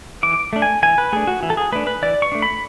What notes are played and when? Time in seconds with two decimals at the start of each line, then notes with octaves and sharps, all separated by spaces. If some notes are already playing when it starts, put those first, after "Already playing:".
0.23 E3 D6
0.53 A3 D4
0.62 G#5
0.83 E3 G#5
0.98 B4
1.12 A3 D4 G#4
1.27 F#4
1.43 E3
1.50 A4
1.57 G#4
1.72 A3 D4 B4
1.87 B4
2.02 E3 D5
2.22 C#6
2.32 A3 D4
2.42 B5